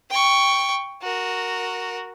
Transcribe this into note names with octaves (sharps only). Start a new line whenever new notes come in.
G5 C#6
F#4 A#4